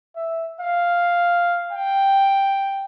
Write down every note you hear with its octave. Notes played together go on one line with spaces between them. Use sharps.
E5
F5
G5